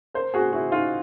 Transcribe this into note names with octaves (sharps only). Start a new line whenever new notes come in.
A#4 C5
F#4 G#4
E4 F#4
D#4 F4